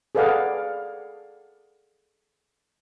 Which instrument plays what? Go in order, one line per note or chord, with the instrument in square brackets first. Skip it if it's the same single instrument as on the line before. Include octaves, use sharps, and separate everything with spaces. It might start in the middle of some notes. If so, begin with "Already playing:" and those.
[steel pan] G#4 A4 B4 D5 F5 F#5